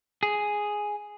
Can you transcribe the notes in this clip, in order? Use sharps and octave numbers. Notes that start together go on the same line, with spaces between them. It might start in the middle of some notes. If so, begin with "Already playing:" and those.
G#4